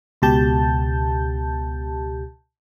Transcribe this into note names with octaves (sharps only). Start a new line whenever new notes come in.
C#2 B2 G4 A5 G6